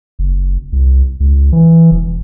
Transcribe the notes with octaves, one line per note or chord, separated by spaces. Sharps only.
F#1
C2
C#2
E3
E1